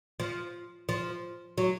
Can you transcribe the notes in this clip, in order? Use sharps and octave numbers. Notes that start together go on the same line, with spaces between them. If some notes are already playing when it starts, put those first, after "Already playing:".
F3
F3
F#3